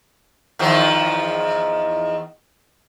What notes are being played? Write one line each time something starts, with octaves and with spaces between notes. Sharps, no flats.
E2 D#3 F3